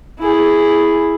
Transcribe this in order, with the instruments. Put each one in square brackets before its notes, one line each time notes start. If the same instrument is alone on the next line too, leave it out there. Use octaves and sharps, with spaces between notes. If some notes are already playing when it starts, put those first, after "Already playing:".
[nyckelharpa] E4 G#4